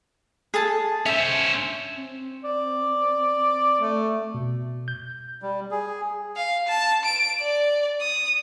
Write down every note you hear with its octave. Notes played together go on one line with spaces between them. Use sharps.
G#4 A4 A5
C#4 C5 E5
C4
D5
A3
B2
G6
G3
G#4
F5
A5
D7
D5
D#6